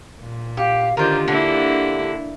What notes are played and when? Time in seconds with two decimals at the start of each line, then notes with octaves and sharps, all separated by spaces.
0.19 A#2
0.57 G4 F5
0.97 D3 D#3 F4 G4 A#4 C5
1.28 D3 A#3 E4